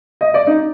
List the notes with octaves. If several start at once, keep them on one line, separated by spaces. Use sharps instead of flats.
D#5
D5
D#4